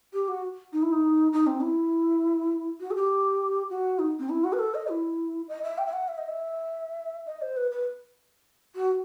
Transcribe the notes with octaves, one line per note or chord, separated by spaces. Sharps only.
G4
F#4
D#4
E4
D#4
D#4
C4
E4
F#4
A4
G4
F#4
D#4
C4
E4
F#4
B4
A4
D#5
E4
D#5
E5
G5
E5
F#5
E5
D#5
E5
D#5
C5
B4
B4
F#4